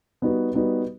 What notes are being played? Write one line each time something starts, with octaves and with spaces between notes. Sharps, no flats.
G3 B3 D#4 F#4 B4
G3 B3 D#4 F#4 B4